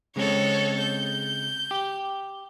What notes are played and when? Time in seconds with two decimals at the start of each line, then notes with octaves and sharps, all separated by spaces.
0.16 C#3 G#3 C4 A4 C#5
0.79 G6
1.71 G4